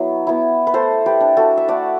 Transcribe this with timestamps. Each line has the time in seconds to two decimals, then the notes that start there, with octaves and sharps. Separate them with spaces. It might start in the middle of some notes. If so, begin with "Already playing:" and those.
Already playing: F#3 B3 E4
0.27 B3 E4
0.67 B4
0.74 A3 A4 C5
1.06 G4 B4
1.21 D4
1.37 F#4 A4
1.57 E5
1.68 A3 D5 F#5